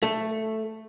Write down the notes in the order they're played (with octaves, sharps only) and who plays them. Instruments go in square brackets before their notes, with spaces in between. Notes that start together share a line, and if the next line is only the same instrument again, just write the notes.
[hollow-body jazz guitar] A3